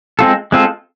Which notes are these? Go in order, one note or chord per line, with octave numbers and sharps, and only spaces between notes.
G#3 C4 F4 A4
G#3 C4 F4 A4